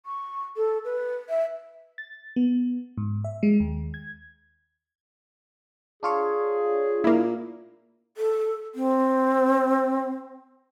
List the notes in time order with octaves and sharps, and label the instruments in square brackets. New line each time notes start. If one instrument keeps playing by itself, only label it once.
[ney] C#6
A4
B4
E5
[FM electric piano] A6
B3
G#2
E5
G#3
D#2
G#6
[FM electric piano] D4 F4 C#5 [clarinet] G#4
[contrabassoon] A#2 [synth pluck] A#3 E4
[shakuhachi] A4
C4